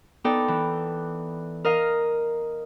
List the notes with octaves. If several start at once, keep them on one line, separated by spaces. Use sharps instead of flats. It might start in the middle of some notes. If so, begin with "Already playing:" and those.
B3 D#4 A4 D5 G5
E3
A#4 D#5 F5